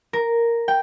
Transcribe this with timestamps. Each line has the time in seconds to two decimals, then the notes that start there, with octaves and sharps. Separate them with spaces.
0.13 A#4
0.68 G5